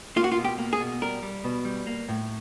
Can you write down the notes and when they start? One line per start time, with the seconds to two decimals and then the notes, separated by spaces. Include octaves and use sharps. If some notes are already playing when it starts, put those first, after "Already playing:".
0.16 A#3 F4
0.24 F#4
0.32 F4
0.38 B2
0.45 G4
0.58 A#3
0.73 G#4
0.80 B2
1.02 G3 A#4
1.22 G3
1.44 B2
1.65 G3
1.87 A#3
2.09 A2